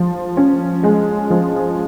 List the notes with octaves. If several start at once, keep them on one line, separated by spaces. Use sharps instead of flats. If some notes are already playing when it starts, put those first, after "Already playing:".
Already playing: F3
C#4
G#3
F3